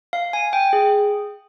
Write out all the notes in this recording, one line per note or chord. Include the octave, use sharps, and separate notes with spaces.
F5
G#5
G5
G#4